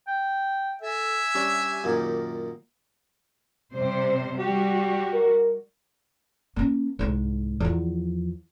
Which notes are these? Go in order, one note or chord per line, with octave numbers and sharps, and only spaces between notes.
G5
A4 E5 G#5
G3 C#4 D4 G4
F#2 A#2 D#3
C3 G3 C5
G3 F#4 G4
A#4
A#3 C#4
C2 G#2
E2 F3